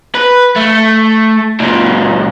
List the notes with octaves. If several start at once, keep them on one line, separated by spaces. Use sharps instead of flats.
B4
A3
C#2 A#2